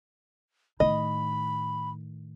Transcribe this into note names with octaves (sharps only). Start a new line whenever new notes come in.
A2 D#3 D#5 B5